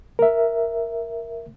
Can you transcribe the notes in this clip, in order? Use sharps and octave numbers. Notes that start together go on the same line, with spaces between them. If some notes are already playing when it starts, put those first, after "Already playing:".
A#4 E5